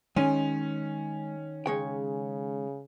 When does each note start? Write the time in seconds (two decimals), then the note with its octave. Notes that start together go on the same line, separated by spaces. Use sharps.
0.16 D#3 G#3 C#4 G#5
1.66 C#3 G#3 C#5 G5